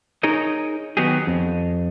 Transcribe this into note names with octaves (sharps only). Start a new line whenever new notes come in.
D#4 G#4 A#4 C#5 D#5
D#3 F#3 B3 D#4 G4 G#4
F2